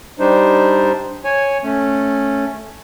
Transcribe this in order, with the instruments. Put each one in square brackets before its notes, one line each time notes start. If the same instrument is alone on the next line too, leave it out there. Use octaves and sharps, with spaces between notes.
[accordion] G3 D4 D#4 C5
C#5 G#5
A3 C#4